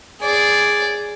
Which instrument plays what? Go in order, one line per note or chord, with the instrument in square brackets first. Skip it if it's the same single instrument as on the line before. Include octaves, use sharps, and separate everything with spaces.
[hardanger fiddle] G#4 D5